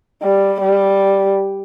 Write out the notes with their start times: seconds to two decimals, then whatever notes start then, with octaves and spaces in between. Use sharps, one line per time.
0.22 G3
0.60 G3